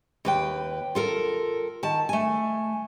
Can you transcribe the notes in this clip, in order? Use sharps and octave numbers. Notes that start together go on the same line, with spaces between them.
D#2 B4 G5
F4 A4 A#4
D#3 A5
A3 G#5